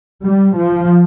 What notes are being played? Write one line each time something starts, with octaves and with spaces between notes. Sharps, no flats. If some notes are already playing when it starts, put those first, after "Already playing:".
G3
F3